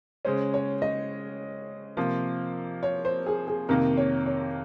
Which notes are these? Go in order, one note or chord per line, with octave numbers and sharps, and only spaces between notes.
C#3 G#3 C#4 C5
C#5
D#5
C3 F3 A#3
C#5
C5
G#4
G#4
F2 C3 D#3 A#3 A#4
C#5
C#5